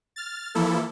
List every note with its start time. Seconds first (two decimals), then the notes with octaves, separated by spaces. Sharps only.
0.16 F6 A6
0.55 E3 F3 A#3 E4 A4